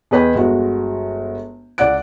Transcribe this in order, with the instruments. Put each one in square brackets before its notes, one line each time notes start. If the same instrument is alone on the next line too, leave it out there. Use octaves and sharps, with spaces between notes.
[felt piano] E2 G#4 B4 D#5 G5
G1 G#3 F#4
C#2 D5 F#5 F#6 D7